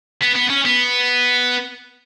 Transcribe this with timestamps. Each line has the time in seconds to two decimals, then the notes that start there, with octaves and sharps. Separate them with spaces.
0.23 B3
0.36 B3
0.50 C#4
0.65 B3